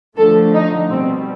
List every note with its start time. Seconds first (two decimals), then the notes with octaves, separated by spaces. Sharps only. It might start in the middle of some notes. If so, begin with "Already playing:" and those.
0.17 D3 F3 A3 A4
0.54 D#4
0.90 B2 G3 C4